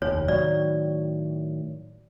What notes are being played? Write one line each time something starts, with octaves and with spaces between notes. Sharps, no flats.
F1 D#2 C#5
A2 D#3 F#3 D5